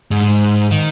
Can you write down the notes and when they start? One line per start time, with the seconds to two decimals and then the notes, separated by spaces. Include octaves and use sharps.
0.11 G#2
0.71 D#3